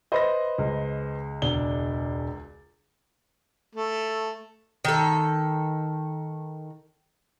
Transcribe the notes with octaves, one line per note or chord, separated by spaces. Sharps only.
B4 C5 D#5 E5 B5 A#6
C#2
E1 D4 G7
A3
D#3 A4